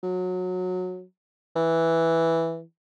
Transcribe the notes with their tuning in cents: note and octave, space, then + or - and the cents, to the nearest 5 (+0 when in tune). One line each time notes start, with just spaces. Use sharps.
F#3 -20
E3 +0